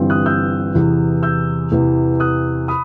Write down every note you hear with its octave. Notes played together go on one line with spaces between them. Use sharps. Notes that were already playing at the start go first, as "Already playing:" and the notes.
Already playing: G1 G2 E3 G3 C4
D#6 F#6
E6 G6
E2 C3 E3
E6 G6
E2 C3 E3
D#6 F#6
B5 D#6